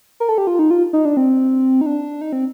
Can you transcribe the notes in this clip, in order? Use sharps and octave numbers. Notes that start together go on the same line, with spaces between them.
A#4
A4
G4
F4
D#4
F4
D#4
D4
C4
D#4
D4
D#4
C4